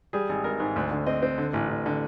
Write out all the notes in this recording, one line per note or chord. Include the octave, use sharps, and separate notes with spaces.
G3 G#4
G#1
G#1 A#4
G#2
D2
D3
C4 D#5
C4
D3
A1
A1
D3